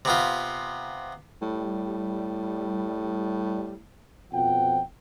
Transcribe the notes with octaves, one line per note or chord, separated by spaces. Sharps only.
C3 B3 F4
A2 G3
F2 B2 F3 F#5 G5